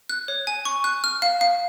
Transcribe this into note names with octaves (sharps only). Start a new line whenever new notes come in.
F#6
C#5
G#5
C#6
F#6
F6
F5
F5